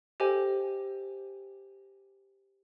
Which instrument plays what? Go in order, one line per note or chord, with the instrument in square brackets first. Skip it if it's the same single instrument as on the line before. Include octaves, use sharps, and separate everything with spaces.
[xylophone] G4 A4 C5 D#5 G5 G#5